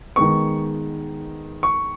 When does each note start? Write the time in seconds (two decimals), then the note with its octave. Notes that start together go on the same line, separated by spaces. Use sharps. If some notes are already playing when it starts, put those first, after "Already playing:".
0.16 D#3 G#3 B3 C#6
1.63 C#6